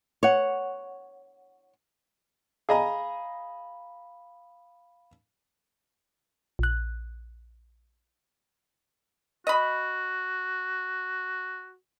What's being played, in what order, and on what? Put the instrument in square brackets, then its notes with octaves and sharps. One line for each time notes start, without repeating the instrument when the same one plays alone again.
[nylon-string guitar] C#5 F#5
[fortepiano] G#4 D#5 A#5 [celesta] F5 B5
[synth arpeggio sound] A#1 F#6
[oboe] F#4 [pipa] D#5 B5